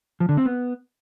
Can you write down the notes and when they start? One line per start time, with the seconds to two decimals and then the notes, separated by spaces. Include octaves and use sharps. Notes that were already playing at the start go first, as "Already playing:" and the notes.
0.20 F3
0.29 D3
0.37 C4
0.46 B3